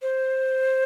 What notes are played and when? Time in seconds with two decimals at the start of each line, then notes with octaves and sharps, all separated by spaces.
0.02 C5